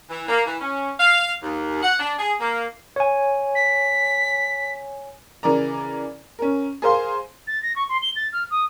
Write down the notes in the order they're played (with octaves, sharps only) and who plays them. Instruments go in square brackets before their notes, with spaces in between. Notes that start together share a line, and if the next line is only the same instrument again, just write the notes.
[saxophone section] E3
A#3
E3
C#4
F5
D#2
F#5
D4
G#4
A#3
[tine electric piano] C#5 G#5
[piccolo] B6
[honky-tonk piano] C#3 E3 A#4 D5 A#5
C#4 A#4
G#4 A#4 C5 F5 C6
[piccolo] A6
A#6
C#6
C6
G7
A6
F6
D#6